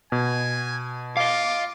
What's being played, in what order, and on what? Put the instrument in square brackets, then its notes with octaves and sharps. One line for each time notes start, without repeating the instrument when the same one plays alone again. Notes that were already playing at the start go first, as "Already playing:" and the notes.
[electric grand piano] B2 [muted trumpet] G#5
[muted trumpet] F4 [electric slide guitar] D#5 F5 [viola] D6